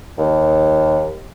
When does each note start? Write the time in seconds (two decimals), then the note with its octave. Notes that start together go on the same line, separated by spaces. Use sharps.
0.18 D#2